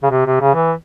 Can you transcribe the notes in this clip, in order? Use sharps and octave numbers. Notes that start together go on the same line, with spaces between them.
C#3
C3
C3
C#3
E3